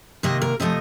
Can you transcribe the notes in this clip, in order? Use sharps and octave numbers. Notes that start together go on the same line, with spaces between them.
C3 D#3 A#3 D#5
A#4
C3 F3 A3 D#5